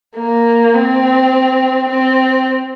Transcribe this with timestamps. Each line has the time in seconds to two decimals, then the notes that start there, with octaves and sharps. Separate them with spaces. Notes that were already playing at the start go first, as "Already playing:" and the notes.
0.17 A#3
0.75 C4
1.89 C4